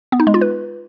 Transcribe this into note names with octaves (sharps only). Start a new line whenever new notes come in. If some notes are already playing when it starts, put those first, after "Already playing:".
B3
D#4
G#3
F4
B4